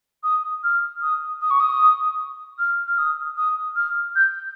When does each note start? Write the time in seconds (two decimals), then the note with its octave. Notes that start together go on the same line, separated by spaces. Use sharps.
0.24 D#6
0.64 F6
1.02 D#6
1.41 D#6
1.50 C#6
1.60 D#6
2.59 F6
2.87 F6
2.98 D#6
3.37 D#6
3.76 F6
4.16 G6